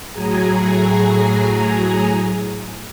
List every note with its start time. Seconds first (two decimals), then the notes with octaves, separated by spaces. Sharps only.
0.11 A2 F#3 G#4 G#5 A#5